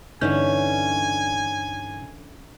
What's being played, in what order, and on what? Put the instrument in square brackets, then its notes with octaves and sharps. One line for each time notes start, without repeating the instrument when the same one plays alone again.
[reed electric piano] G2 D#4 G6 [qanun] D3 E3 C#4 [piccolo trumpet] G#5